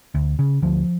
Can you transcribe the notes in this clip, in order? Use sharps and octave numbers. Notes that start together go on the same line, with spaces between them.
D2
C#3
D2 F3